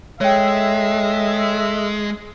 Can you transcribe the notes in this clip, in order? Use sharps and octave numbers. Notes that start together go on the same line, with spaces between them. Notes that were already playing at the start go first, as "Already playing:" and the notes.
G#3 A4 C#5 D#5 E5 G5